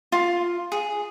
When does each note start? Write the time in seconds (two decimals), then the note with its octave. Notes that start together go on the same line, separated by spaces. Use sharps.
0.12 F4
0.72 G#4